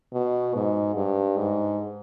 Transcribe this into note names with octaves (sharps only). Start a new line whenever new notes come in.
B2
G#2
G2
G#2